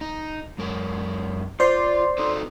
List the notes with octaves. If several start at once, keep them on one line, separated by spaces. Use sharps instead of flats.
D#4
F#2 G#3 A#4
F4 C5 D5 C6
D#4 A4 B4